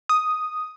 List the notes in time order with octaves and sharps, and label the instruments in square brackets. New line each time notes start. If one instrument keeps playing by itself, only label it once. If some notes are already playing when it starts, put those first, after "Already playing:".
[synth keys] D#6